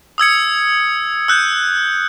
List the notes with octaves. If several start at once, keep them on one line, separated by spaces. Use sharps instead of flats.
D#6 E6 G#6 C#7
E6 F#6 G6